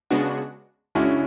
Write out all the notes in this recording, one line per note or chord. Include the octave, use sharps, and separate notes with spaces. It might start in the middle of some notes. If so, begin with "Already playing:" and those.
C#3 G#3 B3 D4 F#4
C#3 G#3 C#4 D4 E4 F#4